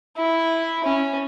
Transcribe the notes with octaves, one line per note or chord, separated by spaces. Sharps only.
E4
C#4